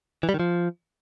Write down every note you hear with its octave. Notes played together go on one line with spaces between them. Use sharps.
E3
G3
D#3
F3